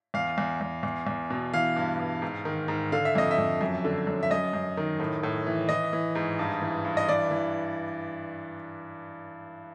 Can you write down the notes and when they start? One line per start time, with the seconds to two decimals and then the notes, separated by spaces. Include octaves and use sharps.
0.14 E2 F5
0.38 E2
0.61 E2
0.83 E2
1.07 E2
1.30 B2
1.53 E3 F5
1.76 G2
1.99 G2
2.22 G#2
2.45 D#3
2.68 G#2
2.92 D3 F5
3.05 E5
3.15 F2 D#5
3.31 E5
3.38 F2
3.61 F#2
3.84 D3
4.07 F#2
4.23 E5
4.31 F#2 D#5
4.53 F#2
4.77 D#3
5.00 A2
5.23 A2
5.47 E3
5.69 E3 D#5
5.93 E3
6.15 G#2
6.39 G2
6.62 E3
6.85 G2
6.97 D#5
7.09 E3 D5
7.31 E3